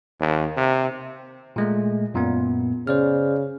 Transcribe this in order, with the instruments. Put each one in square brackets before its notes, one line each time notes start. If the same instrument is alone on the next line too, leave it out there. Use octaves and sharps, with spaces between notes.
[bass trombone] D#2
C3
[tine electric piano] A#2 G#3 A3
F#2 A#2 B3
[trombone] C#3 [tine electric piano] C5 D5 F6